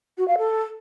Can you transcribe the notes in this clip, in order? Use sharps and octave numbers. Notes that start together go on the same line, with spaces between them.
F#4
F5
A4